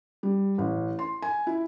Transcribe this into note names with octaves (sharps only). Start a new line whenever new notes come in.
G3
A1
C6
G#5
E4